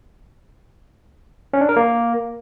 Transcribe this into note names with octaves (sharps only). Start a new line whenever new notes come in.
C#4
D4
A#4
A#3